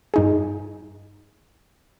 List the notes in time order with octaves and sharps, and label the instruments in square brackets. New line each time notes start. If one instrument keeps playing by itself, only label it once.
[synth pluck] G2 D#4 G#4